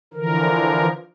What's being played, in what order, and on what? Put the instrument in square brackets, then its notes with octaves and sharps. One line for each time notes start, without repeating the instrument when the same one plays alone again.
[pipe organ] D3 E3 F3 A#4